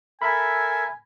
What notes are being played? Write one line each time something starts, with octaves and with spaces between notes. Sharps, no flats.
A4 A#4 E5 G#5 B5